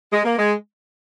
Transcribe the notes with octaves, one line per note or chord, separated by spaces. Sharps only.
G#3
A#3
G#3